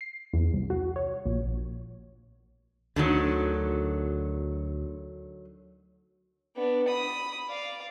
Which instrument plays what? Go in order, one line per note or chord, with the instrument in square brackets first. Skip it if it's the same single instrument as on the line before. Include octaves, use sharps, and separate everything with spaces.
[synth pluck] C7
E2
C2
F#4
C#5
A#1
[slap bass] D2 [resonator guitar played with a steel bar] D3 D#3 F#3
[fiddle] B3 D4
B5 D#6
D5 F5